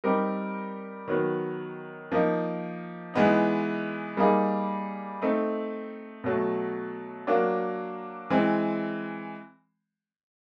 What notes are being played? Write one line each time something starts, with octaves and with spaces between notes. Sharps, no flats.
G3 C4 D#4 G4 A#4
D#3 F#3 B3
F3 A#3 D#4
E3 G#3 B3 D#4
G3 A#3 D#4 G#4
A3 C4 D#4
B2 F#3 A3
F#3 A#3 D4
E3 G#3 C4